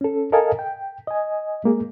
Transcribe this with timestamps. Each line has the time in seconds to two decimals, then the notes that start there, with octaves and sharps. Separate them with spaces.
0.01 C#4 A4
0.32 A4 A#4 D#5 F5 G#5 A5
0.59 G5
1.07 D#5 G#5
1.64 G#3 A#3 G#4